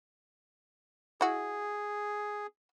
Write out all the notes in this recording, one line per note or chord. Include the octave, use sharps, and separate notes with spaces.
E4 F#4 G#4